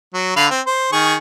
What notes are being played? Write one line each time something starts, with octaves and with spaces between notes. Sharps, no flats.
F#3
D3 F5 B5
C4
C5
D#3 G#4 C#6